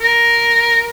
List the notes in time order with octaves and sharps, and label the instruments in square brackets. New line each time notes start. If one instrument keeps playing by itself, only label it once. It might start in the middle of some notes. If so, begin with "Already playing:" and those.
[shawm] A#4